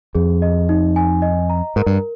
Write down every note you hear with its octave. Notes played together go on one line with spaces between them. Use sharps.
F2 G#4
D#5
D#4
G#5
D#5
A#5
G#2 A#4
G2